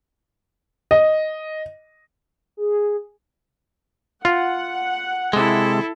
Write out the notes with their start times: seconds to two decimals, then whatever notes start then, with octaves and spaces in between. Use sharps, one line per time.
0.91 D#5
2.57 G#4
4.25 F4 F#5
5.33 C3 G#3 E4 A4